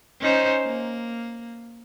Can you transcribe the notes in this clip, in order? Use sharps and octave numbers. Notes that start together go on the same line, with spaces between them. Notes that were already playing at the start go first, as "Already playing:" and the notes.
C#4 D#4 C5
A#3